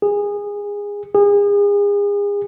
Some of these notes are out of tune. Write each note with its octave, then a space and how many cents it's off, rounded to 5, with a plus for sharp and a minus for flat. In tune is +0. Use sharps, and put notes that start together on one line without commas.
G#4 -20
G#4 -35